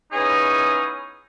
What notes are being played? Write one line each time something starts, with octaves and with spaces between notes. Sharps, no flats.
B3 C#4 D#4 E4 G#4